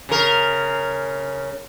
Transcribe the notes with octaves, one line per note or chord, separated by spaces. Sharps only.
C#3 A#4